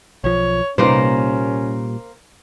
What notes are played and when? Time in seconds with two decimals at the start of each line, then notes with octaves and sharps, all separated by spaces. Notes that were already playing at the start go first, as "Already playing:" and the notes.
0.24 B1 F3 C#5
0.78 C2 A#2 G3 A#3 C#4 D#4 B4 C5